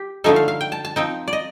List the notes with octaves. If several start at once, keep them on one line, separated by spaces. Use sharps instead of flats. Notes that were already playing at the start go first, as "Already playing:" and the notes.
Already playing: G4
D3 F3 A3 D#4 A4
F5
F5
G5
A5
A5
F3 C4 D#4 G5
D5
D#5